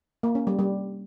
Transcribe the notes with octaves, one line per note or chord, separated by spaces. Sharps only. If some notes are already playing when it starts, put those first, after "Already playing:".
A#3
C#4
G3
G3